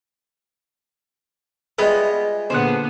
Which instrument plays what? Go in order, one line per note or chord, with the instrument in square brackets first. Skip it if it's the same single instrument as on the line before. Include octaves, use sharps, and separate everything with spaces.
[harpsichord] G3 G#3 [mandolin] B3 [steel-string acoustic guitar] F4 D#5 E5
[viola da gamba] A#2 D3 B3 [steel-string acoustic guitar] C#4 G#4 A5 [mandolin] C5 F#5